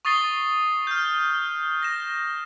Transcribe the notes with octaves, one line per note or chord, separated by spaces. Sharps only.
C#6 D#6 A6 C7 G7
F6 G6
A#6 E7